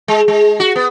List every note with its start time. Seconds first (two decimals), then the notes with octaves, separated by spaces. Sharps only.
0.08 G#3
0.28 G#3
0.60 F#4
0.76 B3